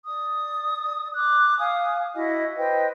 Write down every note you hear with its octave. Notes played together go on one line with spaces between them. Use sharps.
D5 D#6
D6 F#6
F5 G#5 D#6
E4 F#4 D#5
B4 C5 D#5 G5